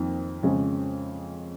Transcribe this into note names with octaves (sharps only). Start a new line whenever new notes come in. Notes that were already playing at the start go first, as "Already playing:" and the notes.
Already playing: F2 D#3 A#3 A#4
F2 C#3 G#3 C#4